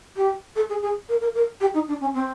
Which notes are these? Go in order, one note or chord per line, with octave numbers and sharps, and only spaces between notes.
G4
A4
G#4
G#4
A#4
A#4
A#4
G4
D#4
D4
C#4
C4